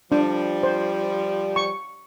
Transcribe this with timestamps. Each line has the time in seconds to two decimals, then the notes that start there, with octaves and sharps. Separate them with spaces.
0.12 F3 G3 D4
0.63 C5
1.56 C#6